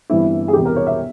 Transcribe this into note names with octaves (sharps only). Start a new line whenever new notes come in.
G1 G2 E3 G3 C4 E4
G#4
E1 E2 C3 G4
A#4
C#5
E5